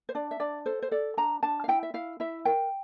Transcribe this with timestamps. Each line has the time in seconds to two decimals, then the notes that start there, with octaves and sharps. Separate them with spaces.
0.09 C5
0.15 D4 D5
0.31 E5
0.40 D4 D5
0.66 A4 C5
0.82 C5
0.91 A4 D5
1.17 D4 A#5
1.43 D4 A5
1.64 F5
1.68 E4 G5
1.83 E5
1.94 E4 F5
2.20 E4 E5
2.45 A#4 G5